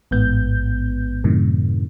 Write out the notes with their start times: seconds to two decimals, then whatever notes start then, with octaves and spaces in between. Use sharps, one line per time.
0.11 A1 G#2 B3 G6
1.24 F#2 A2 C3 D#3